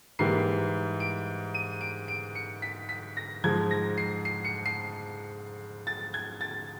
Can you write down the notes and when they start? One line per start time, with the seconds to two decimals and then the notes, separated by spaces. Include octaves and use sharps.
0.19 G#2 E3 G3 A#3 C7
1.00 D7
1.54 D#7
1.81 D7
2.08 D7
2.35 C#7
2.62 B6
2.89 B6
3.17 A#6
3.44 G#2 F3 G#3 G#6
3.71 A#6
3.98 C7
4.25 C7
4.45 C#7
4.66 C7
5.87 A6
6.14 G#6
6.41 A6